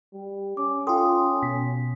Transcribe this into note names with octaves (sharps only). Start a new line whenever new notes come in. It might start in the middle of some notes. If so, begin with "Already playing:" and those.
G3
C#4 D6
F4 A4 G5 C6 D#6
B2 B6